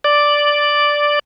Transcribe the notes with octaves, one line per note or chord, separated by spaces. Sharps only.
D5